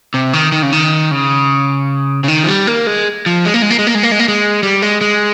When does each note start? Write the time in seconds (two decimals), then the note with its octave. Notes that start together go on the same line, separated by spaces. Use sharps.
0.14 C3
0.33 D#3
0.52 D#3
0.63 C#3
0.73 D#3
1.11 C#3
2.24 C#3
2.28 D#3
2.44 F3
2.48 G3
2.67 A#3
2.87 G#3
3.26 F3
3.45 G#3
3.54 A#3
3.62 G#3
3.70 A#3
3.79 G#3
3.87 A#3
3.95 G#3
4.03 A#3
4.12 G#3
4.19 A#3
4.28 G#3
4.63 G3
4.82 G#3
5.01 G#3